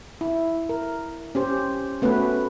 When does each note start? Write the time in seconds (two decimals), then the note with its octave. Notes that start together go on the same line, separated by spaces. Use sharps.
0.21 E4
0.69 A#4
1.35 C#4 G4 C5
2.02 A3 B3 C#4 F#4 B4